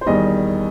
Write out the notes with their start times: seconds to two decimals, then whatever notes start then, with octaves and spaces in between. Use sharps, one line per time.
0.01 C5
0.06 E2 D#3 G3 D#5